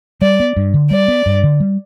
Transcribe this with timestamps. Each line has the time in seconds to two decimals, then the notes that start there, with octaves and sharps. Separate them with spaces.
0.22 G3 D5
0.40 B3
0.56 G2
0.74 D3
0.91 G3 D5
1.08 B3
1.26 G2
1.44 D3
1.60 G3